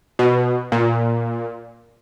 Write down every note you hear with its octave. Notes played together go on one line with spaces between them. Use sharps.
B2
A#2